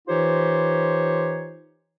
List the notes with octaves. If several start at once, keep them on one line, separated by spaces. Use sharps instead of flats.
E3 D#4 F4 G4 C5 C#5